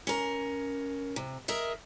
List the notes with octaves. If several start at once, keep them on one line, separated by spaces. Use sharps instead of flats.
C#4 A#4
C3
G#4 A#4 D#5 E5